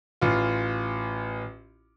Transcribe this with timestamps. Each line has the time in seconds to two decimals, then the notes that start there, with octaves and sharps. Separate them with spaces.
0.21 A1 F4